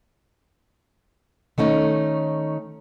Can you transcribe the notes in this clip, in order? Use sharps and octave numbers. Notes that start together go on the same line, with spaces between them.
D#3 A3 C#4 D#4